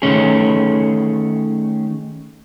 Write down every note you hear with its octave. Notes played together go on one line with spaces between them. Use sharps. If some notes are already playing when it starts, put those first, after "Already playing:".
D#3 A3 C#4 G#4